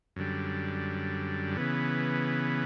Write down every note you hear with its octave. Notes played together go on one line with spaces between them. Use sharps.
F#2 D3 G3
C#3 E3 B3